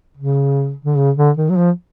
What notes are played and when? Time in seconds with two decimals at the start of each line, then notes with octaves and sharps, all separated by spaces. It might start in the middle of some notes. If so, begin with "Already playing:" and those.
0.17 C#3
0.85 D3
0.97 C#3
1.17 D3
1.37 D#3
1.50 F#3
1.57 F3